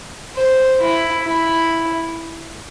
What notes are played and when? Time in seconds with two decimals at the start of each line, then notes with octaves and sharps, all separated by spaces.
0.36 C5
0.81 E4
1.25 E4